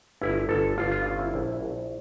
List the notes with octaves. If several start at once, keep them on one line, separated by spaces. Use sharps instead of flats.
G1 E4
G1 A4
G1 F4
F4
C#4 F4
E4
A#1
A#1